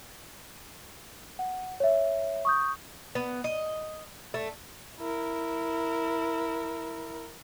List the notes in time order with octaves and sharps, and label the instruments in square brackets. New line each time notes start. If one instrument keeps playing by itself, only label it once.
[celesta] F#5
C#5 E5
C#6 D#6 G6
[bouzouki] B3
D#5
A3
[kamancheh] E4 A#4